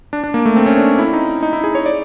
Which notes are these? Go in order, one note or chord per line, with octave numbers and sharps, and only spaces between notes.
D4
D4
A#3
A3
C4
C#4
D4
E4
D#4
D#4
E4
G#4
C#5
D5